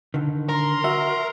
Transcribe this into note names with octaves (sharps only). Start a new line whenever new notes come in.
D3 D#3
A#4 C6
F#4 E5